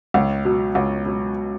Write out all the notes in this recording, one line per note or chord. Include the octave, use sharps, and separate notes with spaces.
C#2
B2 F#3
C#2
B2 F#3